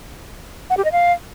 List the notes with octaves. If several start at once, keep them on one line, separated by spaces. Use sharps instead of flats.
F#5
G4
D#5
F5